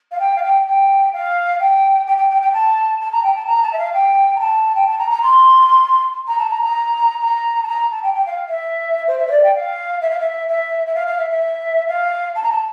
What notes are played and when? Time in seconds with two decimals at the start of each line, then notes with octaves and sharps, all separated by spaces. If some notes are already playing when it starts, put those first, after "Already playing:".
0.11 F5
0.19 G5
0.35 F5
0.43 G5
0.66 G5
1.13 F5
1.59 G5
2.07 G5
2.17 G5
2.30 G5
2.41 G5
2.53 A5
3.00 A5
3.12 A#5
3.23 G5
3.35 A5
3.46 A#5
3.62 A5
3.73 E5
3.78 F5
3.93 G5
4.35 A#5
4.40 A5
4.75 G5
4.86 A5
4.98 A#5
5.10 A#5
5.22 C6
6.27 A#5
6.38 A5
6.50 A#5
6.62 A#5
7.21 A#5
7.63 A5
7.67 A#5
7.90 A5
8.02 G5
8.14 G5
8.26 F5
8.49 E5
9.07 C5
9.19 E5
9.27 C5
9.31 D5
9.43 G5
9.54 F5
10.01 E5
10.10 F5
10.20 E5
10.48 E5
10.86 E5
10.95 F5
11.07 F5
11.18 E5
11.30 E5
11.87 F5
12.35 A5
12.43 A#5
12.51 A5